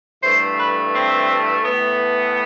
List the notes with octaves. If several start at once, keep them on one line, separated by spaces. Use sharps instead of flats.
G2 E3 A3 C5
B4
C4
A2 E3 B3